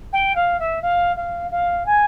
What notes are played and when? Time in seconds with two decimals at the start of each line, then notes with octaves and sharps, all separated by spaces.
0.12 G5
0.35 F5
0.59 E5
0.82 F5
1.16 F5
1.51 F5
1.86 G#5